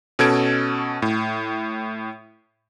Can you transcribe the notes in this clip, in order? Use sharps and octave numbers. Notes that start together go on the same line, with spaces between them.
B2 C#4 A4 G#6 D7
A2